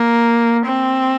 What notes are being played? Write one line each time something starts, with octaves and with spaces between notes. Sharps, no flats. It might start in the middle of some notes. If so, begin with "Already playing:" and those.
Already playing: A#3
C4